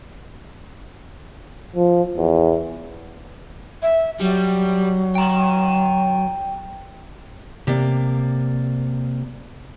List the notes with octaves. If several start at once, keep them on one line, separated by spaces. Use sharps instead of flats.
F3
E2
E5
F#3 G3
G5 A#5
C3 A#3 D5